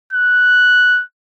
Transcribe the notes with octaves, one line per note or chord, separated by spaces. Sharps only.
F#6